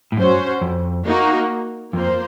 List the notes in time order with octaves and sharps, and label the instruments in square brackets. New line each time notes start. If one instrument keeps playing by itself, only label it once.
[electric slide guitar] A2
[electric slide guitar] F#2 [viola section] C#4 F#4 C5
[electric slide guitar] F2
[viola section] A#3 D#4 F#4
[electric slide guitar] F2 [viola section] A#3 F4 C5